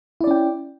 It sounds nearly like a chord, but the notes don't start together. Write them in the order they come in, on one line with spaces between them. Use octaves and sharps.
E4 D5 C#4 G5